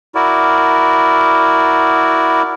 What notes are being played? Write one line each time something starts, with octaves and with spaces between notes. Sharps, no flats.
E4 F#4 A#4 D5